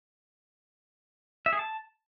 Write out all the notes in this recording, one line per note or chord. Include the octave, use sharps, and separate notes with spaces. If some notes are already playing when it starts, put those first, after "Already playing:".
E5
G#4
A5